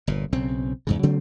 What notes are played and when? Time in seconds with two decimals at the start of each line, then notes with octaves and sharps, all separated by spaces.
0.07 G1 A#2
0.33 B1 C#3 C4
0.87 E2 G#2 C#3
1.03 C#3 F#3 A3 C4